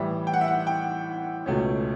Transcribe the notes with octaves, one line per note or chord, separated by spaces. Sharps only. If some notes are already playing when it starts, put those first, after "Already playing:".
Already playing: A2 E3 G3 E5
G5
F#5
E5
F#5
G5
C#2 B2 A3 C#4